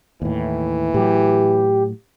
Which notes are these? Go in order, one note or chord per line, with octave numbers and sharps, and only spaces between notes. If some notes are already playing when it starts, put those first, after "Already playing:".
D#2 A2 E3
A2 F#3 G4